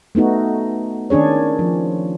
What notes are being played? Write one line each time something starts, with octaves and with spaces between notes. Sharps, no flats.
A3 B3 D#4 F#4
D#3 C#4 D4 G#4 C#5
F3